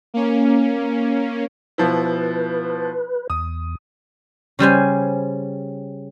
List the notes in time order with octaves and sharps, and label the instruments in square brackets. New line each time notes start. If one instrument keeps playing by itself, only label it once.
[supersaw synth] A#3 C#4
[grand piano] B2 F3 E4 [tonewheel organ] B4
[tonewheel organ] E2 [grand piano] D#6
[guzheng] C#3 G3 C5 G#5